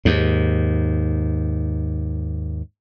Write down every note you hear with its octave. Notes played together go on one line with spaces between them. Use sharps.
D#2 G#2